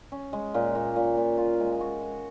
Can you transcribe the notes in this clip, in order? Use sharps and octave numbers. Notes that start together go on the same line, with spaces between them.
C#4
G#3
A#2
A#2
A#2
A#2
F4
G#3
F#4
F#4